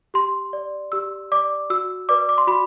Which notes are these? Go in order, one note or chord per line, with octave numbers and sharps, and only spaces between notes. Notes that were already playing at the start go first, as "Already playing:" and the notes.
G4 C6
D5
G4 E6
D5 D6
F#4 E6
B4 D5 D6
D6
C6
F#4 B5